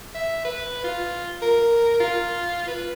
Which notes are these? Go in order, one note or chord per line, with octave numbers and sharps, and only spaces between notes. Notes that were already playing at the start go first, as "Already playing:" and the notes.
E5
B4
F4
A#4
F4
B4